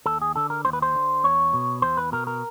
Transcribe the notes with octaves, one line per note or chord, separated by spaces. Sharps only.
D#2 A4
G#4
D3 A4
A#4
D#2 C5
B4
C5
D3
E2 C#5
B2
E2 C5
B4
B2 A#4
A#4